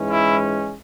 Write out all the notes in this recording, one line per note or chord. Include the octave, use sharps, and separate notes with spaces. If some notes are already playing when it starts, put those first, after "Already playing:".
Already playing: G#2 E3 G#3 C#4
E4